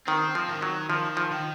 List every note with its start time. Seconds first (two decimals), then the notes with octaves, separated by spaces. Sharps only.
0.07 D#3 C4
0.35 F3
0.48 D#3
0.62 F#3
0.90 D#3 F3
1.17 F3
1.31 D#3